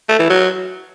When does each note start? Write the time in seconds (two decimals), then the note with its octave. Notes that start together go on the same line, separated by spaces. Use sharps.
0.09 A3
0.19 E3
0.30 F#3